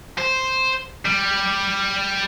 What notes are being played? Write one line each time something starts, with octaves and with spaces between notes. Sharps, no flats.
C5
G3